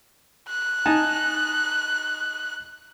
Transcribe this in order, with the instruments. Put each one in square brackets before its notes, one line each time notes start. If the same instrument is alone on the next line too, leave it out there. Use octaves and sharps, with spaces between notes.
[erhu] F#6
[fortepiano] D#4 G#5 A5